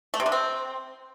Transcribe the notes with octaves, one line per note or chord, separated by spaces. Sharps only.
A3
C3
D3
C4